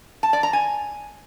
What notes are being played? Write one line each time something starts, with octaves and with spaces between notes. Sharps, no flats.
A5
D5
A#5
G#5